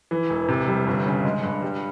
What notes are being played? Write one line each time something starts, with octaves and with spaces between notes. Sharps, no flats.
E3
E1
C3
G3
G1
C#3
G#3
G2
G3